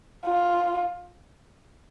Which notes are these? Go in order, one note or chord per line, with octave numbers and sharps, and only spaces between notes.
F4